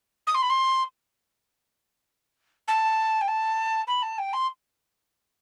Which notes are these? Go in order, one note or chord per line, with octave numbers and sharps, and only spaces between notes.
D#6
C6
B5
C6
A5
G5
A5
B5
A5
G5
C6